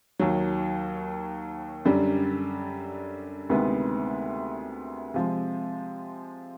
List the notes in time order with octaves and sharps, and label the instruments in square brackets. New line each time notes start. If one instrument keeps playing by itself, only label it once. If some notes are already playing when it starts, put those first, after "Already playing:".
[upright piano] D#2 D#3 F#3
F#2 D3 G3
D2 C3 D#3 G#3 B3
C3 F3 G#3